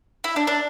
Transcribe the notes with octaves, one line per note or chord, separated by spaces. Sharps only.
E4
D4
D4